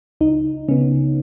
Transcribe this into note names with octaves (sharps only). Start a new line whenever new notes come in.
C#2 D#4
C#3 B3 C#4